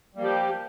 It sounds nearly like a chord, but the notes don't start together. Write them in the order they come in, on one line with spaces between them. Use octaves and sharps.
G3 A#3 F3 G4